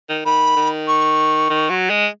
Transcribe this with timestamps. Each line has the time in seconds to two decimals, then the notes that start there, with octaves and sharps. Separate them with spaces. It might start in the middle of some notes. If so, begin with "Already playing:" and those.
0.09 D#3
0.25 D#3 B5
0.56 D#3
0.88 C#6
1.50 D#3
1.70 F#3
1.90 G#3